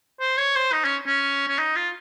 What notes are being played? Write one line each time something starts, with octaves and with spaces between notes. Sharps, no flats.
C5
C#5
C5
D#4
C#4
C#4
C#4
D#4
F4